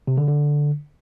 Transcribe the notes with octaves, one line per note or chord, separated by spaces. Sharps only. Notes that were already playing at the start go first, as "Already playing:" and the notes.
C3
D3
D3